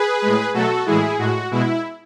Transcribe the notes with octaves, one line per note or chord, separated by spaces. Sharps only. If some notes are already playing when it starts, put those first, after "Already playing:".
Already playing: G#4 B4
A2 G#3
B2 F#3 A3 F#4 A4
A2 E3 G#3 E4 G#4
A2 G#3 F#4
B2 G#3 E4